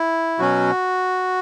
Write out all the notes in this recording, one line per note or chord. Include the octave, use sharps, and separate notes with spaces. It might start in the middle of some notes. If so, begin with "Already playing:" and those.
Already playing: E4
B2 F#3 C#4 F#4